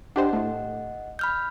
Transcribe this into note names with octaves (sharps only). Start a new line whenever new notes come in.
D4 G4 C5 D#5 F#5
A2 A3
B5 F6 G6